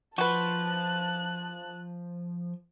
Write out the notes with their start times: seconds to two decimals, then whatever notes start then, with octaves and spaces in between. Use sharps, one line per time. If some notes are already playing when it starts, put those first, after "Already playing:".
0.18 F3 F#4 B4 A5 F#6